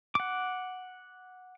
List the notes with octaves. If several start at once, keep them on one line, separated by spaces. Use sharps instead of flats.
F#5 D6